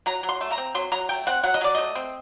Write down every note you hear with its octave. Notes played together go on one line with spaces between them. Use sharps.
F#3 A#5
F#3
C6
A3
A#5
C4
F#3 C6
F#3 A#5
A3 G5
C4 F#5
F#3 F#5
D#5
F#3 D5
A3 D#5
C4